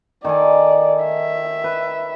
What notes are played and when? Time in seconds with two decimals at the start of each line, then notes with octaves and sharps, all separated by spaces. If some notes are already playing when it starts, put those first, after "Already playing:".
0.24 D#3 A4 D5 G#5
1.04 E5
1.64 B4